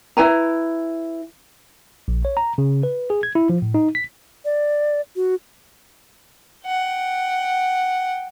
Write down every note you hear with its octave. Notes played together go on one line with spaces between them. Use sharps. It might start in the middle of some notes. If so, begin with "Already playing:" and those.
E4 B4 G#5 A#5
A#1
C#5
A#5
C#3
B4
G#4
G#6
E4
F3
A2
D#4
B6
D5
F#4
F#5 G5